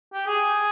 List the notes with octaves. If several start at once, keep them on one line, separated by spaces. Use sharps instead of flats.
G4
G#4